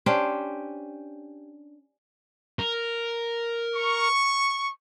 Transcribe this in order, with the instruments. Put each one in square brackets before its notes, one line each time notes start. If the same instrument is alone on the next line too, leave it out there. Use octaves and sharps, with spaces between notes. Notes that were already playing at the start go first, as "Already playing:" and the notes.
[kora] C#4 D4 G4 C5
[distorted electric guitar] A#4
[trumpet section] C#6